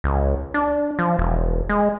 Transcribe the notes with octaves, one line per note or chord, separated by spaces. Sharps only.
C#2
D4
F3
E1
G#3